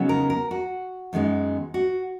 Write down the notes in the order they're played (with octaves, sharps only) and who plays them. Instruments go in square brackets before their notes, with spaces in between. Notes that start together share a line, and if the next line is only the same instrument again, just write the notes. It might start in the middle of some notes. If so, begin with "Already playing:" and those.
Already playing: [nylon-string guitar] C#3 F#3 B3 D#4
A#4
A#4
F#4
F#2 D#3 G#3 B3 D#4
F#4